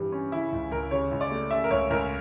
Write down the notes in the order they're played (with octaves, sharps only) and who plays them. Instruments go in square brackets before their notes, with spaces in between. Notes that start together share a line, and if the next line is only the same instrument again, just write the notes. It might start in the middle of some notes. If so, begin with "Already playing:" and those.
Already playing: [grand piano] G2 E3
C#4
C#3 E4
C#2
C#2 A#4
C#3 C#5
C#2
D5
A3
C#3 E5
A#4
C#2 C#5
C#2 A#4